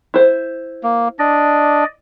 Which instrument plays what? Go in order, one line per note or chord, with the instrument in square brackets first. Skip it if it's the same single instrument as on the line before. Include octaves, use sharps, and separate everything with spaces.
[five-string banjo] E4 C5
[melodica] A#3
[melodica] D4 [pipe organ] D5 D#5